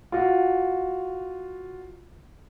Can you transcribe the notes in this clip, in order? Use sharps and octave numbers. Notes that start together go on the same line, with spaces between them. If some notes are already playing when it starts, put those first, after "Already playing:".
F4 F#4